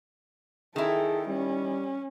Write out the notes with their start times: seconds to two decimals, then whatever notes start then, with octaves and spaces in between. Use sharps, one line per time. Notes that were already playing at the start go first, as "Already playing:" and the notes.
0.76 D#3 E4 G#4 A4 G5
1.27 G3 C#4